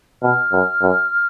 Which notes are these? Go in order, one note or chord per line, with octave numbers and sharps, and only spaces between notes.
B2 F6
F#2
F#2